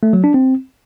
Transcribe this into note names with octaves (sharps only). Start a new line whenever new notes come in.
A3
F#3
D4
C4